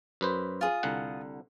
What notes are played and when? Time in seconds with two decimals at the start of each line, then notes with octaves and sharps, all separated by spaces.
0.21 F#2 B4 C5
0.61 F4 G#4
0.83 C2 D3 F#5